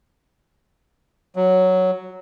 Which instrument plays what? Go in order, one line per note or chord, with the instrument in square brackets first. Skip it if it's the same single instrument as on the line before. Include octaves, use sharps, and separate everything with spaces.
[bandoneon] F#3